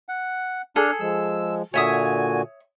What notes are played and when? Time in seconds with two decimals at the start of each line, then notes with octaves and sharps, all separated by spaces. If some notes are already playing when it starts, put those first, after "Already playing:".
0.09 F#5
0.76 D4 G#4 A4 F6
1.00 F3 G#3 E6
1.74 A#2 D3 F#4 C#5 E5 G#5 D#6